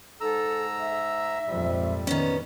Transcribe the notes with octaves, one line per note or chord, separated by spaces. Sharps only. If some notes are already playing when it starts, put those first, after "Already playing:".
G#2 A4 A#5 E6
E5
A#1 F2 G#2 G3
D#3 B3 C#4